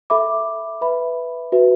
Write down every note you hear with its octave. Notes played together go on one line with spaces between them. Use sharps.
A4 E5 B5 D6
B4 E5 B5
F#4 B4 E5